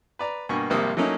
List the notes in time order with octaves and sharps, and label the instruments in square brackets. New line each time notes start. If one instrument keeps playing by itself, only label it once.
[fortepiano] B4 D5 A#5
G2 B2 A#3 G#5 C#6
G#1 C3 F3 G3 A#3 D#6
F#3 A3 A#3 C#4 D#4 E4